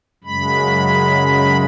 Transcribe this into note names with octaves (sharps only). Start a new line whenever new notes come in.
F#2 C#3 G#3 B5